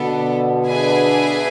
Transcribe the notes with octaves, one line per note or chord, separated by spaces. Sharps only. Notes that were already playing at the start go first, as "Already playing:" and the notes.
Already playing: B2 D3 B3 D4 A4
D4 G#4 B4 E5 G#5